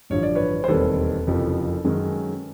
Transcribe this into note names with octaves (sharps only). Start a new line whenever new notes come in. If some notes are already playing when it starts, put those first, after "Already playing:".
A1 G2 D3 F3 C#5
D5
B4 C#5
C5
E1 D#2 D#3 G3 C4 A4 B4
F#1 F2 C3 F3
F#2 D#3 G#3 C#4